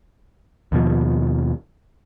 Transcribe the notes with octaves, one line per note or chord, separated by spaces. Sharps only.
D#2 B2 F3